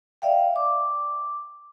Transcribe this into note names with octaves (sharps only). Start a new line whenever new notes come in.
D5 E5 F5 G5
D6